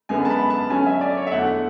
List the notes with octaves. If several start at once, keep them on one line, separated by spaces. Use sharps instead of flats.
F#2 D3 G#3 B3 G#5
A5
B5
A5
D3 F#3 C#4 G#5
E5
D5
C#5
E5
E2 D3 A3 F#5